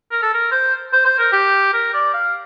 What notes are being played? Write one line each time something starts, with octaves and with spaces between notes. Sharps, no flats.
A#4
A4
A#4
C5
C5
C5
A#4
G4
A#4
D5
F5